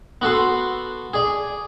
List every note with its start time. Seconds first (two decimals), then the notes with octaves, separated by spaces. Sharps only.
0.21 B3 F#4 A4 C6
1.14 G#4 D5